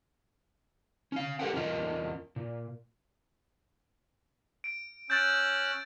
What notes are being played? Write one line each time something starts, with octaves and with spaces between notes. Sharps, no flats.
C#4 F5
G4 A4 A#4 C#5 F#5 G5
E2 C#4 F4 A#4 D#5
A#2
D7
C#4 E6 F#6 G6 A6 D7